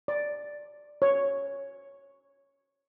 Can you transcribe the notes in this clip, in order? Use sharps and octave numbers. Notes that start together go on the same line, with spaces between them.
D5
C#5